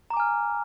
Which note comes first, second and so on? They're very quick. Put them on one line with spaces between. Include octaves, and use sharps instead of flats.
A#5 D6 G#5 F6